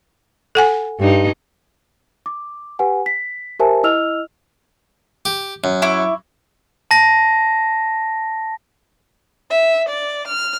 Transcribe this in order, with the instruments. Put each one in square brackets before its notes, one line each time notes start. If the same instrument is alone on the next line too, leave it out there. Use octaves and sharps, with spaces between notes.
[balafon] A4 F#5 G#5
[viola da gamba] G2 D#4
[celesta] D6
G4 B4 F#5 G#5
B6
G4 A#4 C5 E5 G#5 A5
E4 D#5 E6 F6 F7
[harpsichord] G4
F#2
[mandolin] E4 C#6 D6
[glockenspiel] A5 A#6
[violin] E5
D5
F6